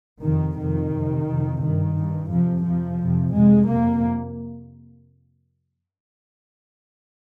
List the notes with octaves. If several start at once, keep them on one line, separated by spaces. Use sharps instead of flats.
F2 C3 D#3
F2 C3 D#3
F2 C3
F2 C3
G2 D#3
G2
F2 C3 F3
F2 C3 F3
F2 C3
F2 C3 G#3
F2 C3 A#3